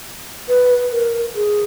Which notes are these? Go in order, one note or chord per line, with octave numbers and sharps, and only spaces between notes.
B4
A#4
G#4